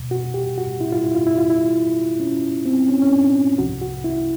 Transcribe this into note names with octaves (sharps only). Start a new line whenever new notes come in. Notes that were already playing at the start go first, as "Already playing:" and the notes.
Already playing: E2 B2
F#4
G4
F#4
E4
F4
E4
F4
E4
F4
E4
C#4
C4
C#4
C#4
D4
C2 C3 F3 F#4
F#4
E4